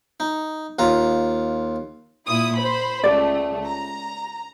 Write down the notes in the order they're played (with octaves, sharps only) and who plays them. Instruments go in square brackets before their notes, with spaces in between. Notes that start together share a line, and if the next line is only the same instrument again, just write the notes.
[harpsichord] D#4
D#2 F4 A#5
[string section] A#2 E4 D#6
C5 B5
[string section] C#2 A3 [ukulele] G4 D5
[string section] A#5